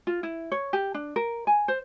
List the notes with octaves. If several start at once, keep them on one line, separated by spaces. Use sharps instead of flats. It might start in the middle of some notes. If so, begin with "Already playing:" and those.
F4
E4
C#5
G4
D4
A#4
G#5
C5